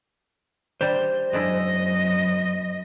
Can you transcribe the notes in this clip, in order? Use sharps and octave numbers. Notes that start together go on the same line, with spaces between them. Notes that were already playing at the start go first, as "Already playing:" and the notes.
G3 D4 G4 C5
F#2 G#3 D4 E4 D#5